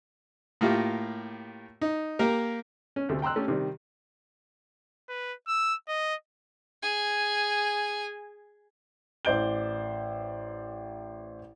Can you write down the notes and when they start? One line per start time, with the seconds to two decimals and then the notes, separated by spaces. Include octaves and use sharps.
0.61 A2 A#3 F4 G4
1.82 D#4
2.19 A#3 G4 A#4
2.96 C#4
3.09 D2 C3 A3
3.22 G5 A#5 C6 E6 F#6
3.36 A3 C#4 G4 A4
3.48 C3 D#3 G3
5.09 B4
5.48 E6
5.88 D#5
6.83 G#4 G#5
9.25 A1 C5 D5 G6 D7 G7